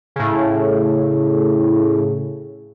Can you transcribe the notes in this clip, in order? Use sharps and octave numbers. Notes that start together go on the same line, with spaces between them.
A2 C#3